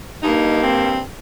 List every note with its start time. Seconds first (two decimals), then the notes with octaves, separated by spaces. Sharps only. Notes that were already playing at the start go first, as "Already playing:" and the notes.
0.23 G2 G3 A#3 D#4
0.63 C4